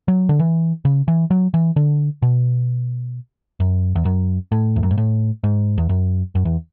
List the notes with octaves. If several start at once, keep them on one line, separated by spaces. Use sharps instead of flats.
F#3
D3
E3
C#3
E3
F#3
E3
D3
B2
F#2
E2
F#2
A2
E2
F#2
G#2
A2
G#2
E2
F#2
F#2
E2